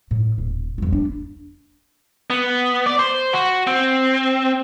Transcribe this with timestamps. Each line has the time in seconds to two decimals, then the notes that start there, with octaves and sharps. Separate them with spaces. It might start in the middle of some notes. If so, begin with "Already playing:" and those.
0.11 A2
0.38 D#1
0.78 E2 G2
0.92 D4
2.30 B3
2.86 D5
2.99 C5
3.33 F#4
3.67 C4